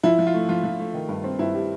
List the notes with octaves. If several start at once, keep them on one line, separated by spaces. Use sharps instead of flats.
F3 E4
F3
F4
A3
F3 F4
F3
A3
D#3
G2
C4
G2 E4
G3